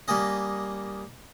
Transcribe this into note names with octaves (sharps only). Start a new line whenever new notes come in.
G3 A#3 C#4 D#5